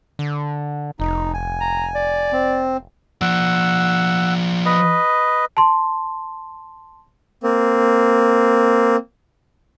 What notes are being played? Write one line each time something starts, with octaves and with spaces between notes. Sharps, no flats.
D3
F1 D#4
G#5
A#5
D5
C4
F3 D5 F#5 E6
B4 D#5
A5 C6
A#3 C4